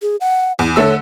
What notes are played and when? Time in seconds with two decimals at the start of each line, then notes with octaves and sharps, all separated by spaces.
0.02 G#4
0.21 F#5
0.59 E2 E4
0.76 D3 A3 C#5 E6